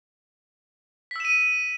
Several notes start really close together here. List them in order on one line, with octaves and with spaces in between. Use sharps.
B6 E6 E7 D#7